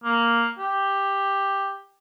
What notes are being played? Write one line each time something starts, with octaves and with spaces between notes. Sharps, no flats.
A#3
G4